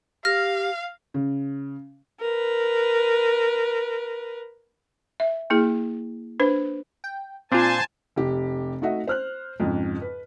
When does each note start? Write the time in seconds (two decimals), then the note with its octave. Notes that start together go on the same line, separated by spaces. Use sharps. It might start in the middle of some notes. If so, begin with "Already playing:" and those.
0.25 G4 F5 F6 A#6
1.14 C#3
2.20 A#4 B4
5.20 E5
5.50 A#3 E4 G#4
6.40 D4 B4 C5
7.04 G5
7.52 A#2 C4 D4 F4 C5 G#5 A5
8.16 F1 G4
8.82 A3 D#4 F#4 D#5 E5 F#5
9.07 C5 F6 F#6
9.60 F2 G#2 C#3
10.02 B4